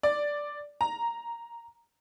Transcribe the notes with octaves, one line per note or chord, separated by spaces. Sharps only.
D5
A#5